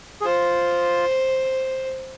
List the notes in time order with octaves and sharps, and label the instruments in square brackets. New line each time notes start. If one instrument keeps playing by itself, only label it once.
[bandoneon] G#4
[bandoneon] F4 [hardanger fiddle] C5